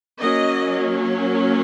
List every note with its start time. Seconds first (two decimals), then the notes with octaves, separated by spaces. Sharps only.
0.20 F#3 A#3 C#4 D#5